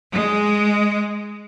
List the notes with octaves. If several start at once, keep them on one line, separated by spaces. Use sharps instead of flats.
G#3